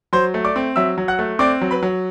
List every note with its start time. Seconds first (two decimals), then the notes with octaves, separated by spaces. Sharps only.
0.13 F#3 C5 C6
0.34 A3
0.45 D5 D6
0.56 C4
0.76 F#3 E5 E6
0.98 F#3
1.08 F#5 F#6
1.19 A3
1.39 C4 D5 D6
1.61 F#3
1.71 B4 B5
1.83 F#3